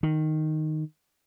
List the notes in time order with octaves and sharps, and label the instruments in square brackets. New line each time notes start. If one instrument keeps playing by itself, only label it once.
[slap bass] D#3